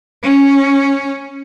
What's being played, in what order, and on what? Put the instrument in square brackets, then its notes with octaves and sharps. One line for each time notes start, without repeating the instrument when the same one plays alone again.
[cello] C#4